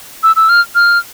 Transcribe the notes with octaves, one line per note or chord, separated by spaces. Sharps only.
E6
E6
F6
F6